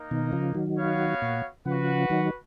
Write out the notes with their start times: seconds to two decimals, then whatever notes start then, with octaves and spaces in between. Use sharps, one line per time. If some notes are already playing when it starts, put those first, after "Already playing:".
Already playing: A#3 D#4 A#4
0.11 B2 D#3
0.32 C#3 F3
0.55 D#3 F#3
0.77 B3 F#4 C#5 F5
1.22 A#2
1.65 C#3 F3 F#4 B4 F#5
2.10 D#3 F#3